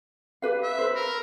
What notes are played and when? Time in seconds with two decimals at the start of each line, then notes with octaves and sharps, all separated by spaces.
0.42 G4 B4 F5
0.63 E5
0.79 B4 C5
0.96 A#4